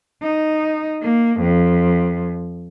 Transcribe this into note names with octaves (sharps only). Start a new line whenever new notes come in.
D#4
A#3
F2